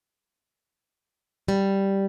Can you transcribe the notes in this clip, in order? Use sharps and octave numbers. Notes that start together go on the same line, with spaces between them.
G3